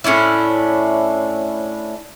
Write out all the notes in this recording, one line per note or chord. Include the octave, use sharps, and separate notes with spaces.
A2 C#4 D4 E4